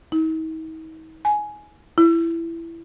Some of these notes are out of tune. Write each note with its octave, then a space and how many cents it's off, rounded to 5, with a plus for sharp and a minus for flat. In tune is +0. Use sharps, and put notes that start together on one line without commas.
D#4 +45
G#5 +15
E4 +15